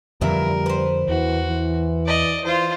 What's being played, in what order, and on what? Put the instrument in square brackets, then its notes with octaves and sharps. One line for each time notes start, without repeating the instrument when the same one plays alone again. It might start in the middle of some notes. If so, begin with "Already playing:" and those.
[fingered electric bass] F2 D3 F3 [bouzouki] A#2 E3 E5 [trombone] G3 [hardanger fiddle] A#4
[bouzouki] B4 C5
[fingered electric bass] E2 [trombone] E3 [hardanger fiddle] F#4
[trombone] E3
[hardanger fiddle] D5 D#5
[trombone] E3 [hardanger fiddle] F4 C5